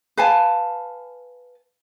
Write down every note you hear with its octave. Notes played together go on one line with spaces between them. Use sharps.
B4 F5 G#5 A5